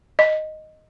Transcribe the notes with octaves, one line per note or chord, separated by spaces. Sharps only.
D#5